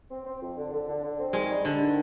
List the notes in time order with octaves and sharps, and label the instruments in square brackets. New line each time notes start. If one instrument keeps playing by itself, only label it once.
[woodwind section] C4
C4
F2
D3
D3
D3
D3
C4
[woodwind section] D#3 [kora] G#3
[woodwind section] G3
[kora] D3 [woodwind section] G3
[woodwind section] D#3